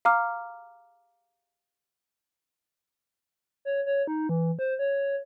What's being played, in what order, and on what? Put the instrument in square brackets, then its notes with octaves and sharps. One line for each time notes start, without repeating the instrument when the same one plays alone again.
[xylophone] F5 A#5 D6 F6
[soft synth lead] C#5
C#5
D#4
E3
C5
C#5